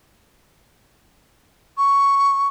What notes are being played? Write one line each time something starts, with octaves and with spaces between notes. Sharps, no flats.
C#6